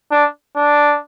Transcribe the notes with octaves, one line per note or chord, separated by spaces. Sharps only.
D4
D4